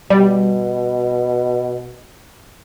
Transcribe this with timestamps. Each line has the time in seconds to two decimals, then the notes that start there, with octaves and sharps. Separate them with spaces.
0.10 B2 G3